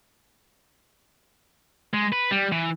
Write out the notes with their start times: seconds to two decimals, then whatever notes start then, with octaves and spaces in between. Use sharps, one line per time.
1.94 G#3
2.13 B4
2.31 G3
2.52 E3